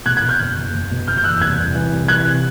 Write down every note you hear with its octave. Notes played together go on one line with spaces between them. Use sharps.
B2 F#6 G#6
F#6 G#6
B2
F6 G6
F#1
F#1
F#1
B2
F#1 F6 G6
G6
E2 E6 F#6
C2 F#6 G#6
C2
E3
C2
E3 F#6 G#6
C3